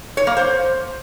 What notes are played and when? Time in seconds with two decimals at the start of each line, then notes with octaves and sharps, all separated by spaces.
0.17 C#5
0.27 A#3
0.37 C5